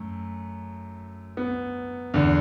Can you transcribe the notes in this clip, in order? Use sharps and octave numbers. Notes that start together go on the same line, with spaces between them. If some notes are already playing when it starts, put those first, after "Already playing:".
Already playing: F#2 A3
B3
E2 D3